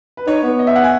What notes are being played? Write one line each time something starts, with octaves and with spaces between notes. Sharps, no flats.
B4
D#4 C#5
B3
D#5
E5
F#5
G#5